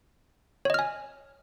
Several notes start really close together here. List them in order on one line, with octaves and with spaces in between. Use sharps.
C#5 D#5 F6 G#5